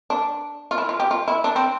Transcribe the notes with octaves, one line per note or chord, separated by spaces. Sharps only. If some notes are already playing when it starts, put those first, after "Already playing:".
D4
F4
E4
F4
G4
F4
E4
D4
C4